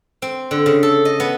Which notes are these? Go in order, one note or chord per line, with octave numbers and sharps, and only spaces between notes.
C4
D3
C#3
A4
D#5
B3